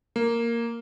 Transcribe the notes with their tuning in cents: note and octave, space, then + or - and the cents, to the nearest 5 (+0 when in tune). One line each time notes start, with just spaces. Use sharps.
A#3 -5